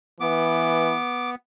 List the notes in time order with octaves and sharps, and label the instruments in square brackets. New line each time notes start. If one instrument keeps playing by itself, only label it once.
[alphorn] E3 [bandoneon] B3 [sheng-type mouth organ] D6